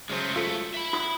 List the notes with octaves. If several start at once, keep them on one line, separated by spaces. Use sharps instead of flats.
C#3 F#3 G#3 A3 C5
F4 A4 E6 B6 C#7
E5 B5
F4 D#6